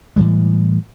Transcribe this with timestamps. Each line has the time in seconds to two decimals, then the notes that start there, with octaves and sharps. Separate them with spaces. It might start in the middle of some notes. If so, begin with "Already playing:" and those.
0.16 A2 E3 G3 G#3